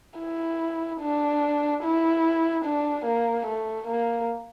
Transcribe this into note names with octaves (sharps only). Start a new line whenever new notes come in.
E4
D4
E4
D4
A#3
A3
A#3